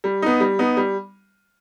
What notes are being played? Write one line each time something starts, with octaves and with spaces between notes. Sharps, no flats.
G3
B3 D#4
G3
B3 D#4
G3